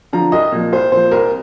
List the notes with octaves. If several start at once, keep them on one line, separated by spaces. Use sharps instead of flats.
D3 F3 A#5
C2 D#5
A#2 F3
C2 C5
A#2 F3 C5
C2 A#4